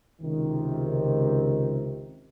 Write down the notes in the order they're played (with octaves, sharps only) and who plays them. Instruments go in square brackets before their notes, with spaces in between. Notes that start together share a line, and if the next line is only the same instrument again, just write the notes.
[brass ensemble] C#2 C3 D#3